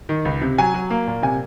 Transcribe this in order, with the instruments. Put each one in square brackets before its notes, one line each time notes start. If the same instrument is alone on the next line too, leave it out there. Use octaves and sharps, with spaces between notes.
[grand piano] D#3
C#2
C3
F#3 G#5
F#3
A#3
A#2
C3 G#5